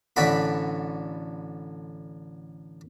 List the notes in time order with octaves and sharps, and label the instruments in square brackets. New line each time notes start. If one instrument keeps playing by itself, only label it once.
[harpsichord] A1 D3 F#4 B5